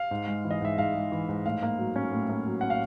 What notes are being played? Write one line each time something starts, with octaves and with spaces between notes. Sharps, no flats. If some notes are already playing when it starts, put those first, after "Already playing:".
Already playing: F5
G#2
G#3
E3
D#5
G#2 E5
G#2 F5
G#3
E3
G#2
A2 F5
A#3
F#3
C#4
A2
A#3
F#3
C#4 F#5
F5